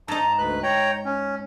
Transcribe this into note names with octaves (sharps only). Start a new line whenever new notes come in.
G#2 D#4 A5 A#5
D2 B4 F#6
C#5 G5 A#5
C#4